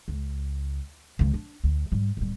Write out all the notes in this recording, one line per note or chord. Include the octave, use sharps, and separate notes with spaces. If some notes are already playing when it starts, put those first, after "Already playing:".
C#2
C#2 C#3
D4
D2
G#2 G3
D1 G3